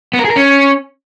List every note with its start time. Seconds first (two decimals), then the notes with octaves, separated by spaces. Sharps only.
0.13 B3
0.19 A#4
0.25 G#4
0.30 A#4
0.36 C#4